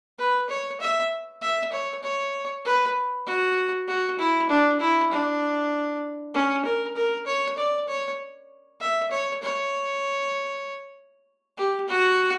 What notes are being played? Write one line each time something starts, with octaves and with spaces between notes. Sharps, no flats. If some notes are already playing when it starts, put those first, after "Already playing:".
B4
C#5
E5
E5
C#5
C#5
B4
F#4
F#4
E4
D4
E4
D4
C#4
A#4
A#4
C#5
D5
C#5
E5
C#5
C#5
G4
F#4